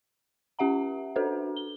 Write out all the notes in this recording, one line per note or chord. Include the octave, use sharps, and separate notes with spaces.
C#4 G4 E5 F#5 A#5
D4 F#4 A4 B4 C5
G7